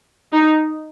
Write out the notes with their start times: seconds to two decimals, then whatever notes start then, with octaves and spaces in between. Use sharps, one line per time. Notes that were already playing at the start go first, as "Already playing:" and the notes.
0.32 D#4